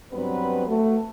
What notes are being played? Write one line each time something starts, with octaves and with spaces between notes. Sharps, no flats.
G2 F#3 B3 C4 B4
A3 F#4